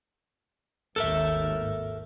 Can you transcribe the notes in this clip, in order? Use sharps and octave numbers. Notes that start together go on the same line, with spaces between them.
G#1 D#2 G#2 A4 A#4 E5